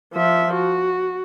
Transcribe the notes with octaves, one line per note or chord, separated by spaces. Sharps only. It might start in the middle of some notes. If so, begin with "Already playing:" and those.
F3 E5
F#4